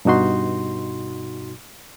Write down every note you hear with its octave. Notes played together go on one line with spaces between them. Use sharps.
G2 B2 D#4 F#4 C6